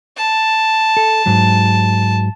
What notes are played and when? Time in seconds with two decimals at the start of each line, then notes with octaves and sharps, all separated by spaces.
0.17 A5
0.97 A4
1.26 G#2 F#3